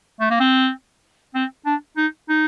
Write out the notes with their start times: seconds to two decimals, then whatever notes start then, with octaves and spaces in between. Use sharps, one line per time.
0.21 A3
0.30 A#3
0.40 C4
1.35 C4
1.66 D4
1.97 D#4
2.29 D#4